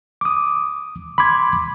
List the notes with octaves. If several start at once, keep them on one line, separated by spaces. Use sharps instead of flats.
D6 D#6
B5 C6 D6 G#6